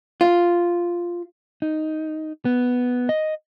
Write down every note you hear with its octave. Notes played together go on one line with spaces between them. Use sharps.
F4
D#4
B3
D#5